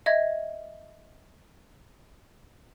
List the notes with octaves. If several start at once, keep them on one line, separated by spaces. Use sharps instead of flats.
D#5 E5 G#6